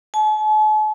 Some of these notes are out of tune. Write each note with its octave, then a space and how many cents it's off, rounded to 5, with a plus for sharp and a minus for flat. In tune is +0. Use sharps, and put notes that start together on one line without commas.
A5 -45